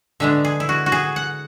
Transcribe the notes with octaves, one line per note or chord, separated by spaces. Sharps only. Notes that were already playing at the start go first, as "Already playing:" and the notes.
D3 G#3 B3 D4 E5
G#4
E4
F#4
F#4
G#4
F#5